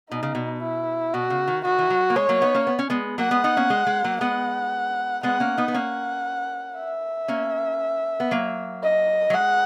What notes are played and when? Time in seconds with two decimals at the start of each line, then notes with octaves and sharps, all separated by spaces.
0.11 B2 D#4
0.23 C#3
0.35 B2
0.62 E4
1.13 B2 F#4
1.30 C#3
1.48 D#3
1.65 D#3 F#4
1.79 E3
1.90 F#3
2.10 A#3
2.16 G#3 C#5
2.29 F#3 A#3
2.42 B3 D#4
2.54 A#3 C#4
2.67 B3
2.79 C#4
2.90 G#3 B3
3.18 F#3 A#3 F#5
3.31 G#3 B3
3.44 B3 D#4
3.57 A#3 C#4
3.70 G#3
3.86 G#3
4.04 F#3 A#3
4.21 G#3 B3 F#5
5.23 G#3 B3 F#5
5.40 A#3 C#4
5.58 B3 D#4
5.68 B3
5.74 A#3 C#4 F#5
6.77 E5
7.28 A#3 C#4
8.20 B3
8.31 F#3 A#3
8.83 D#5
9.30 F#3
9.33 G#3 F#5